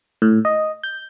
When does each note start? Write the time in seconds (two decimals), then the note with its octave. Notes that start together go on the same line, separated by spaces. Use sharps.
0.22 A2
0.45 D#5
0.83 G6